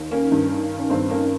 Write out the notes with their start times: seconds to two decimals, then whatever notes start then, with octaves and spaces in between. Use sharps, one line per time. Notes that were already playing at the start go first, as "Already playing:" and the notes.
Already playing: D#2 D#3
0.11 A#3 C#4
0.32 G2 D#3
0.79 C#4
0.90 G2 D#3 C4
1.10 A#3 C#4